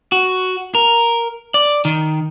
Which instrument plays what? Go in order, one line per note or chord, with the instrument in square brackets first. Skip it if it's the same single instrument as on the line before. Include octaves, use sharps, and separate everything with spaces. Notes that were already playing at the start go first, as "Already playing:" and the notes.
[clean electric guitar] F#4
A#4
D5
D#3